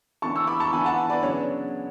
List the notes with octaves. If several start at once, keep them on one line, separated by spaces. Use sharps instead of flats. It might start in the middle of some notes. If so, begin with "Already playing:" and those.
E3 B3 D4 A5 C#6
C#6 E6
B5 D6
A5 C#6
E3 B3 D4 G#5 B5
F#5 A5
B4 D5
C#3 F#3 B3 D4 C#5